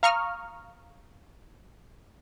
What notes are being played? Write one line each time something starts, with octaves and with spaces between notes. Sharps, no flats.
F5 A#5 C#6 D#6 F6